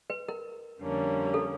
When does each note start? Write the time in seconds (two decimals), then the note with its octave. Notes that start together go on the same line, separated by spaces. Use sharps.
0.10 B4
0.28 A#4
0.80 F2 D3 G3 A#3 C#4
1.34 A4